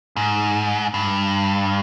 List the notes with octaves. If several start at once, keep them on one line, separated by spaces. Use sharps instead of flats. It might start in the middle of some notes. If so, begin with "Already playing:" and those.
G#2
G2